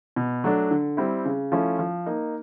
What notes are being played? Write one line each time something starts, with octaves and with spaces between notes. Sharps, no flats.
B2
F#3 A3 D4
D3
G3 C4 E4
C#3
F3 A3 C#4 E4
F3
A#3 D#4